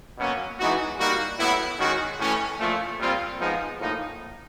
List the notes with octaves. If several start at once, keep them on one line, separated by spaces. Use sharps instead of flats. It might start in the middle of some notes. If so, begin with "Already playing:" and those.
B2 F#3 A#3 C#4
E3 G#3 B3 D#4 F#4
G3 A#3 D#4 F#4
A2 F#3 B3 E4
D#3 G#3 C#4 F#4
A2 E3 A3 C#4
A#2 F3 A3
A#2 G3 C4 F4
F3 G#3 B3 D#4
A2 F3 A#3 D#4